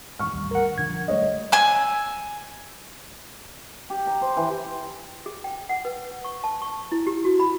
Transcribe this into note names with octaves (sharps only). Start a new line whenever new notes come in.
G#2 E3 C#6 F6
A1 D#2 G3
A#4 F#5
A#1 D3 F3 G#6
F#3 G3 A3 C#5 D#5
G#5 E6
G4
A#5
C5
E3
G#4
G5
F#5
B4
C#6
A5
C#6
E4
G4
F#4
B5